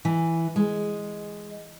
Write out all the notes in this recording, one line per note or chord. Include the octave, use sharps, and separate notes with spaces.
E3
G#3